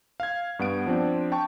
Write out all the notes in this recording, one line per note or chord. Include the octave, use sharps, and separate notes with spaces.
F5 G#6
G2 B3 F#5 D7
F3 C4 D4
G5 A5 C#6